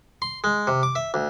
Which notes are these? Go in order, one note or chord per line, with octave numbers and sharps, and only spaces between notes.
C6
G#3
C3
D6
E5
D2